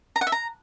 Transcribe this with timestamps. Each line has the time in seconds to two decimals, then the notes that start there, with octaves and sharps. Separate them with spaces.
0.16 A#5
0.21 F#5
0.27 E5
0.32 A#5